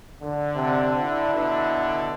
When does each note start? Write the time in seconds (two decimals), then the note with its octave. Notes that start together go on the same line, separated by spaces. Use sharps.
0.21 D3
0.55 C3
1.01 E4
1.33 B2 D3